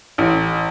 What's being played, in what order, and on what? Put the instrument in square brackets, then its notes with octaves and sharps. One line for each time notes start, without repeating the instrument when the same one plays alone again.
[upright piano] A1